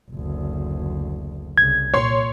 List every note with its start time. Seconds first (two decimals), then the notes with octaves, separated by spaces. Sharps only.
0.11 F#1 D2
1.58 C2 C#3 G#6
1.94 A#2 C#5 C6